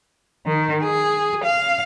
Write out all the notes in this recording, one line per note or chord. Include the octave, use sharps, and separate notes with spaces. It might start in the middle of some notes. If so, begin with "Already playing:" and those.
D#3
G#4
F5